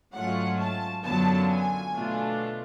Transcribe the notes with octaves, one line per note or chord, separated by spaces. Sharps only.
G#2 F#3 A3 C#4 F4 F#5
A5
F#2 D3 F#3 B3 F4 A5
G#5
B2 A3 D4 F4